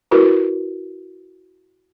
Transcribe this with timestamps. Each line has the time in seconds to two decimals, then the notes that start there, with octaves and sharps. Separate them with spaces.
0.11 E4 F#4 A#4 B4